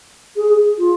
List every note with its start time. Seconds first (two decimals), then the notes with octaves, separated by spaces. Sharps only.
0.37 G#4
0.78 F4